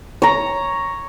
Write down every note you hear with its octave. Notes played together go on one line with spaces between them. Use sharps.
C#5 A#5